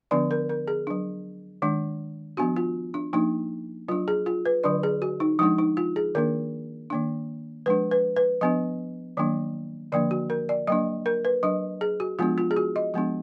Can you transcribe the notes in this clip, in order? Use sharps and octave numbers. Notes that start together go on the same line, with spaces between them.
D3 F3 B3 D4 D5
A#4
A#4
G#4
F#3 D4
D#3 G#3 D4
F3 B3 D4 F#4
F4
D4
F3 A#3 D4 D#4
F#3 D4 F4
G#4
F4
B4
D3 F#3 D4 D5
G#4
F#4
D#4
F3 G#3 D4 D#4
D#4
F4
G#4
D#3 A#3 D4 A#4
D#3 A#3 D4
F3 G#3 D4 B4
B4
B4
F3 B3 D4 D#5
D#3 F#3 A#3 D4
D3 F3 A#3 D4 D5
F#4
A#4
D5
F#3 A#3 D4 D#5
A#4
B4
F#3 D4 D#5
G#4
F#4
F3 G#3 B3 D4 F4
F4
G#4
F#4
D#5
F3 G#3 B3 D4